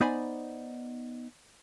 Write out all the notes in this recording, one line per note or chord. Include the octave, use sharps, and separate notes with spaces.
B3 D#4 C5 D5 G#5 B5